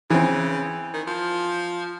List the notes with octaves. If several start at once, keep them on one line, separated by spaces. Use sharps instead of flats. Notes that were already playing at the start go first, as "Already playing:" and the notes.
C#3 E3 C4
D#3
F3